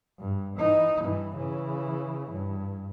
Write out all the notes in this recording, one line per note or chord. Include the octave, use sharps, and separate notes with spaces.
G2
E3 D#4
G2 E3
C#3 E3
G2